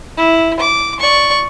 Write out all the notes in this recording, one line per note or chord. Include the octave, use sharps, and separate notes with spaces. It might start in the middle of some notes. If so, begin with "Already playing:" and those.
E4
D6
D5 C#6